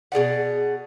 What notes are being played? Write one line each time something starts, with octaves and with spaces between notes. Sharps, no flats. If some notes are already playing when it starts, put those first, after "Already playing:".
B2 G#4 D5 F#5